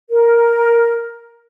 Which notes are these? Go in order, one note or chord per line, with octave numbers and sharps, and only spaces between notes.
A#4